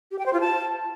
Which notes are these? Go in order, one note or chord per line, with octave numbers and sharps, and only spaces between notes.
G4
G5
C5
F4
A5